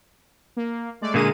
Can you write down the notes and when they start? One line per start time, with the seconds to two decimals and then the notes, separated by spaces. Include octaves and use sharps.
0.57 A#3
1.01 G#3 A3 D5
1.14 A#2 D3 G#3 A#3 D#7